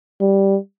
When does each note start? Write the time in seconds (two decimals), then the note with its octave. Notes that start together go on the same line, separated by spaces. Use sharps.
0.20 G3